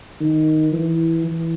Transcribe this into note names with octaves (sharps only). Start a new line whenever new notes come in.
D#3
E3
E3